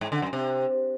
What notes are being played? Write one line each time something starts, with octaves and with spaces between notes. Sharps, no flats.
G#2
D3
F#2
C3